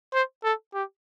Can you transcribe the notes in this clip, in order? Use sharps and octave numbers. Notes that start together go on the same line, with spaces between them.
C5
A4
G4